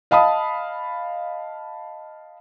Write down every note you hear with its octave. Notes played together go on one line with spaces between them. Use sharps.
D#5 F5 A5 B5 D#6